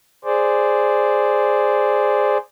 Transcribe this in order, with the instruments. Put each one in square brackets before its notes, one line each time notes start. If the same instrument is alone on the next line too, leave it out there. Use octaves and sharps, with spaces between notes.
[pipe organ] G#4 C5 D5